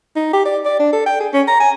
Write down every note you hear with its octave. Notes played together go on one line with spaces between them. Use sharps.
D#4
G4
D5
D5
D4
A4
G5
G#4
C#4
A#5
G#5